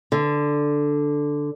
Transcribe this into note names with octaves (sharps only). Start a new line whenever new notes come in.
D3